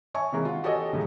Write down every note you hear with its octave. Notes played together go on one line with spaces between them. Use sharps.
C#5 E5 G#5 A5 C#6
C3 D#3 E3 G#3 A#3
F4 F#5
F#4 G4 A4 C#5 D#5 G#5
C#2 A2 F3 F#3 G#3